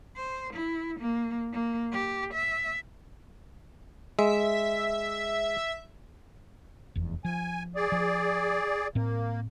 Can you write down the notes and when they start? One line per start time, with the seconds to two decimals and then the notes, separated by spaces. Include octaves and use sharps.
0.16 C5
0.53 E4
0.99 A#3
1.52 A#3
1.92 G4
2.33 E5
4.19 G#3 E5
6.95 F1 E2
7.25 F3 G#5
7.76 G#4 D5
7.92 F3
8.95 A2 A#3 C4